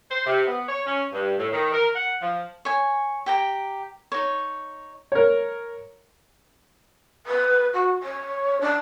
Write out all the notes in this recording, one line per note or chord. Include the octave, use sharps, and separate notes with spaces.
C5
C3
B3
C#5
C#4
G2
A2
D#3
A#4
F#5
F3
C#5 G#5
G4 G5 A#5
D#4 C#5
A#4 C#5
B4
F#4
C#5
D4